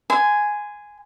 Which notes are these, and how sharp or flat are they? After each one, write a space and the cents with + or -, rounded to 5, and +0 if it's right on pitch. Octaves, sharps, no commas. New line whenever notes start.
G#5 +0 C6 -35